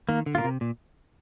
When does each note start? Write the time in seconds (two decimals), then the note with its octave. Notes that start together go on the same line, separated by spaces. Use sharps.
0.09 D#3 A#3
0.26 D3
0.35 A#2 F4 A#4
0.44 C3
0.61 A#2